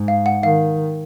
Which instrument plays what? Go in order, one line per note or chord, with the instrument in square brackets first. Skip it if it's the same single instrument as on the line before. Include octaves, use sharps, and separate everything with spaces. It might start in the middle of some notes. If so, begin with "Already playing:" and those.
Already playing: [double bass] G#2
[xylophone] F5
F#5
[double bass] D#3 [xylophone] F5